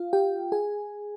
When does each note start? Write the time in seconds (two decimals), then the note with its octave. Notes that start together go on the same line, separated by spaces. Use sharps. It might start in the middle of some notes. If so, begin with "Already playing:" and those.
Already playing: F4 F5
0.13 G4 G5
0.52 G#4 G#5